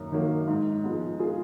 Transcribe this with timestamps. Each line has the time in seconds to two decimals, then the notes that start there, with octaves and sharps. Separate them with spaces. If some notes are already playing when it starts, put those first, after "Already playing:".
Already playing: F#2 D#3 A#3
0.12 D#3 F#3 A#3
0.47 G#2
0.84 F3 G#3 B3
1.19 F4 G#4